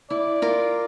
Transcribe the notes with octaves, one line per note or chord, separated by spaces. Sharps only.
E4 D5
F4 A#4